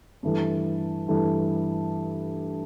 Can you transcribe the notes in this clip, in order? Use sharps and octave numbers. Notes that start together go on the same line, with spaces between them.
G2 E3 A3
G2 E3 A3